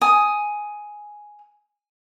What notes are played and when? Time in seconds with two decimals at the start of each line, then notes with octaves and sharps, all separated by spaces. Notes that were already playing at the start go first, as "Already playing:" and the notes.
0.01 G#5 D#6